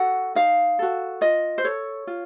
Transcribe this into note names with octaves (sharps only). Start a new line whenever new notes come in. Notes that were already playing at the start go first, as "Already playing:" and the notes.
Already playing: F#4 A4 F#5
D#4 F5
F#4 A4
F4 D#5
C5
A4 C#5
F4